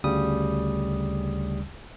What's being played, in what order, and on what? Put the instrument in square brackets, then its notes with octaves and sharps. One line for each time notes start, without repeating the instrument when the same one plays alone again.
[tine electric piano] D2 C#3 G3 D#6